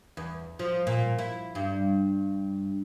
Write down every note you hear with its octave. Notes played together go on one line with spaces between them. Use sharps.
E2
F3
A#2
E4
G2